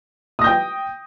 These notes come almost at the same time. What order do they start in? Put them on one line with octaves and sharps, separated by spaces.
D#6 A#6 G6 G5